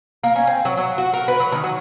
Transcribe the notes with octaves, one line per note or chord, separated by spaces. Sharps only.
A#3
C#4
C4
F#3
F#3
F#4
A#4
B4
F#3
D#3
F#3